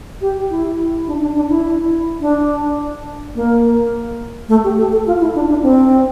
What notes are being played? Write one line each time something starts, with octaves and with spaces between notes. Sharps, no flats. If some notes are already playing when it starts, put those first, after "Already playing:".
G4
E4
D4
D4
D4
E4
D4
A#3
A3
G4
A4
A4
F4
E4
D4
D4
C4